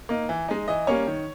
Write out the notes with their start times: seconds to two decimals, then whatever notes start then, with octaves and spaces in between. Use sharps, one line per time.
0.09 A#3 D#4
0.29 E3
0.48 G#3 D#4
0.68 E3 D#5
0.87 G3 A#3 C#4 C#5
1.07 D#3